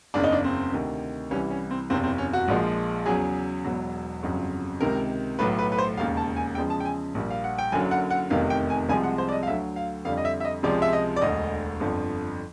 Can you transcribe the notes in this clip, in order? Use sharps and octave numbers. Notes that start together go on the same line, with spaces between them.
F#1 E2 C#3 D4
D#4
D4
C4
D2 C3 D#3
C2 C3 E3 G3 C#4
C#4
C4
F#1 E2 C3 C4
C4
C#4
F#4
A#1 A#2 F3 G#3
E2 C#3 F#3 G#4
E1 E2 B2 F#3
G1 F2 C#3 F#3
C#2 C3 D#3 A#4
B1 A2 F#3 B4
B4
B4
C5
E1 D#2 C#3 F5
A5
G#5
E2 C#3 F3 G#3 G5
A5
G5
G#5
A#1 A#2 G3
F5
F#5
G5
F#1 F#2 D3 F#3 G#5
F#5
F#5
F1 E2 C3 D#3 F5
G5
G#5
C2 C3 F3 G#3 G#5
F#5
C5
D5
D#5
F5
D2 D3 F#3 E5
F5
F2 D3 G3 F5
D#5
E5
E5
D#5
C#2 C3 F3 G#3 D5
E5
D#5
D5
E1 D2 D3 D#5
G1 F2 D3 F3